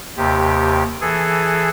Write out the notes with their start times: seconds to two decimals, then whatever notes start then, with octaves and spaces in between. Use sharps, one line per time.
0.17 D#2 C3 G4
1.01 E3 G#4 A4